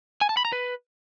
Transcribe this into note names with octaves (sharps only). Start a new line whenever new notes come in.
G#5
A5
B5
A#5
B4